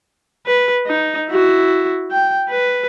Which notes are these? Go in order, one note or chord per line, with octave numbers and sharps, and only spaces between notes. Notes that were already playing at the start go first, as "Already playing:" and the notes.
B4
D#4
E4 F#4
G5
B4